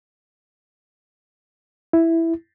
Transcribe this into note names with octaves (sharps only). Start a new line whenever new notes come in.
E4